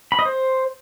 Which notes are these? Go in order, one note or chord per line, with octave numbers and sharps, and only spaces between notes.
B5
D#5
C5